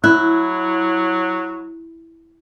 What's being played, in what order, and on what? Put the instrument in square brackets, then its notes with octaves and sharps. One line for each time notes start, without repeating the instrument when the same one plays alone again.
[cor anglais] F#3 [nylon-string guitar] E4 [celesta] F#6